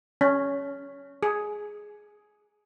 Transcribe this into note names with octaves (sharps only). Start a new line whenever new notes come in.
C#4
G#4